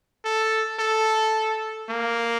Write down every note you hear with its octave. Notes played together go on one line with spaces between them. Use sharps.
A4
A4
A#3